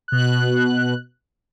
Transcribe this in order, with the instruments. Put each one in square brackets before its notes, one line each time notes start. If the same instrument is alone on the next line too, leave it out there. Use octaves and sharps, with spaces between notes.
[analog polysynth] B2 F#6